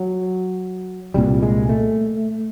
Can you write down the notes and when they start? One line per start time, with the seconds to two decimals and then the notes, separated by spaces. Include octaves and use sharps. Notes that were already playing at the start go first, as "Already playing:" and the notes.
Already playing: F#3
1.14 C2 A#2 G3
1.42 G#3
1.69 A3